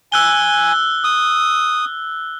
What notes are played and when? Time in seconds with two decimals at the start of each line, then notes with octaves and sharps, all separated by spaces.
0.12 G#5 E6 F#6 G7
1.04 D#6